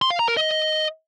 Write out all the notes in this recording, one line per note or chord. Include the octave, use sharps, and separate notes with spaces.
C6
F5
A#5
A#4
D#5